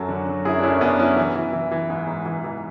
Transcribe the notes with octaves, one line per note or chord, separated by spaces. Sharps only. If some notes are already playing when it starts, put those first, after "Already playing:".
Already playing: F#2 F#3 F#4 A4
D3
F#3
F#2 E4 G#4
D4
F#2 C#4 E4
F#2 B3 D4
F#3 C#4 E4
E3
E3
E3
E3
G#2
G#2
E3
E3